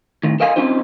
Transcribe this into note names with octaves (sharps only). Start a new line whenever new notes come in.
A2 D#3
A4 A#4 D#5 F5 G5 G#5
C4 C#4 D#4 F4 C5